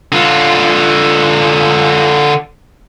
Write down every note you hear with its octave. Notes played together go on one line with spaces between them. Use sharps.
D3 F4